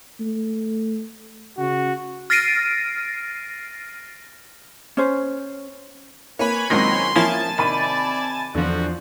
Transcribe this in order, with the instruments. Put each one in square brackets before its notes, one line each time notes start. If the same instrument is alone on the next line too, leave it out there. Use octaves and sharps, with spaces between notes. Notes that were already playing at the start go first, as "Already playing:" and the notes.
[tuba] A3
[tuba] C#3 [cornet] F#4
[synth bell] F6 A6 A#6 C7 D7 D#7
[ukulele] C#4 C5
[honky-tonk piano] A#3 [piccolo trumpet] B4 [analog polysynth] C#5 G#5 B5
[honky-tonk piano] C#2 C4 A#6 [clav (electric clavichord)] A#2 D#3 F#3 [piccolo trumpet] C6
[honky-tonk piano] F3 [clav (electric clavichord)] A#3 C#4 E4 [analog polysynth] G#5 A5 A6
[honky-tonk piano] C3 B5 D#7 [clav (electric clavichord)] D#3 [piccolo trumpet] D5
[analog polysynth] E2 F3 [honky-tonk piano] D3 [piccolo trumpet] F#4